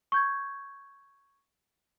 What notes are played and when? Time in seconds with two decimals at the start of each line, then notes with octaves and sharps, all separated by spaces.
0.12 C#6 G6 G#6